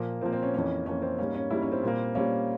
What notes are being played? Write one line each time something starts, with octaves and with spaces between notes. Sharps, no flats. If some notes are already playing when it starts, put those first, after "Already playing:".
Already playing: A#2 F3 A#3
A#2 F3 A#3 C4
C4
C#4
F2 E3 A#3 C#4
F2 E3 A#3 C#4
C4
G#2 G3 A#3 C#4
C#4
G#2 G3 A#3 E4
C#4
C4
A#2 G3 A#3
A#2 G3 A#3 C#4